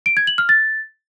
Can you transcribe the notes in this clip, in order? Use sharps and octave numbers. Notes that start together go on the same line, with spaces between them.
D7
G#6
F#7
F6
A6